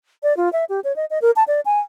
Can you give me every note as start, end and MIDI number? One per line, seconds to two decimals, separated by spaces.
0.23 0.36 74
0.37 0.51 65
0.53 0.65 76
0.69 0.80 67
0.84 0.95 73
0.96 1.05 75
1.10 1.19 75
1.22 1.31 70
1.36 1.44 81
1.48 1.60 74
1.65 1.80 80